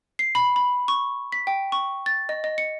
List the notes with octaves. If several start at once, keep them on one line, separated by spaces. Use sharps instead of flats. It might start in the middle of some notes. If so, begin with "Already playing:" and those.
C7
B5
B5
C#6
B6
G5
C#6
A6
D#5
D#5
C#7